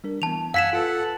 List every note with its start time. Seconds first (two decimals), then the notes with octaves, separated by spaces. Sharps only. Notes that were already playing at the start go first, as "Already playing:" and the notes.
0.04 G3 D4 A#4
0.22 E3 B3 A5 F7
0.54 F#2 F5 F#5 G#5 A5 E6 B6 E7
0.73 F4 A4 B4 F#5